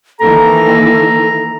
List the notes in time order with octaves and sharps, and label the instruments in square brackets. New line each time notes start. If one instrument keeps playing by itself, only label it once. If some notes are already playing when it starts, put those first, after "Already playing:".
[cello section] D#3 E3 A#3 [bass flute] A4 [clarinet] A#5